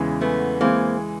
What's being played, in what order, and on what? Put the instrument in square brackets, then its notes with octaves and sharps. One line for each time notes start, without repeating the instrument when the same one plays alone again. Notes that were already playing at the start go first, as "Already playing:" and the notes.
Already playing: [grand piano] E2 C#3 E3 G#3
[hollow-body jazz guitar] A3 B3
[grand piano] E3 G#3 [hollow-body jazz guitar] A#3 C4